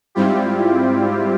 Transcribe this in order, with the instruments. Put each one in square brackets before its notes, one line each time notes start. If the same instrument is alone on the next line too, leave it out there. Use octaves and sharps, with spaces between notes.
[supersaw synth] G#2 G3 C4 E4 F4 G4